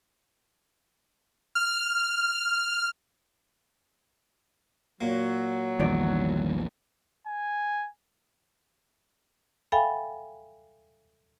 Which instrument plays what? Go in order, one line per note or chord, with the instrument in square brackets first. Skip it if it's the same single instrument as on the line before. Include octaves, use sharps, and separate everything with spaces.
[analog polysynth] F6
[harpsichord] A#2 A#3 [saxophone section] F#3
[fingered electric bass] A#1 E2 [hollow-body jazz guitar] G2 D#3 D5
[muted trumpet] G#5
[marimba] A4 E5 F5 G5 G#5 B5